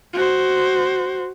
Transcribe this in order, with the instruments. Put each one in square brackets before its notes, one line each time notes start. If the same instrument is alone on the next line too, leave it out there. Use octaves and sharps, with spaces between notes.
[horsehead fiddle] F#4 C5